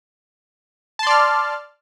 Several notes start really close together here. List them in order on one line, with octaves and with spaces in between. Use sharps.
A5 C6 D5 F6